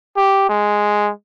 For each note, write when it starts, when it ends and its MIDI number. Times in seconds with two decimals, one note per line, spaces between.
0.16 0.46 67
0.49 1.11 56